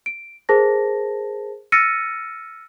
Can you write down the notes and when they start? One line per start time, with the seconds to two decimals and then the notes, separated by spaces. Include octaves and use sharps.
0.06 D7
0.49 G#4 A#4 C5 A5 A#6
1.72 E6 F6 A6 A#6 C#7 D#7